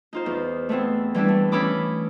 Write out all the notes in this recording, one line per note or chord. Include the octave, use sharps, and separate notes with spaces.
D#4 F4 C5
E2
A3 B3 C4 E4
E3 G3 D4 E4
A3
E3 C#4 E4 B5 D6 D#6